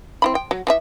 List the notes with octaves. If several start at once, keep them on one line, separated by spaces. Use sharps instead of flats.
C4 E4 B5
G5
F#3
E3 G#4 E5